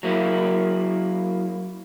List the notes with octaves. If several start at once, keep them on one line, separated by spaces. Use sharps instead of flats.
F#3 A#3 E4